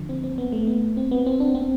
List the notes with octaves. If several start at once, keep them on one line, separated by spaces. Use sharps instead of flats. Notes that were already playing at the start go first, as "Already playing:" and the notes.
Already playing: D3 F3
C4
C4
B3
A3
B3
C4
B3
C4
D4
C4